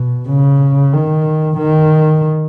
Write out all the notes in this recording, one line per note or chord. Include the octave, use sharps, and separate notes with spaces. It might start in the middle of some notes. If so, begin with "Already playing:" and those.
Already playing: B2
C#3
D#3
D#3